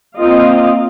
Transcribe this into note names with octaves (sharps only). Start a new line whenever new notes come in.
A#3 C4 F4 D#5 F5